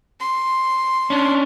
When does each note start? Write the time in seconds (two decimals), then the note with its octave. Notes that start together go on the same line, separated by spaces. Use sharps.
0.20 C6
1.10 C#4 D4